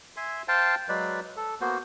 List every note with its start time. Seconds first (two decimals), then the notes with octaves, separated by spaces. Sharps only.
0.17 E5 G#5 C6
0.48 C5 F5 G5 A5
0.89 F#3 G#3 B4 D5
1.37 A4
1.61 A#3 B3 F#4 C5